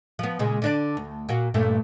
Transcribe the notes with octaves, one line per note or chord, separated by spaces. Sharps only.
F3 B3
A#2 C#3 G#3
D3 D4 D5
D2
A#2 A#3 F#4
G2 A#2 A3